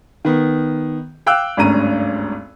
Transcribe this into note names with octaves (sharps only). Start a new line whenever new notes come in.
D#3 B3
F5 G5 D6 E6 F#6
G#1 D2 G2 C#4 A#5 D#7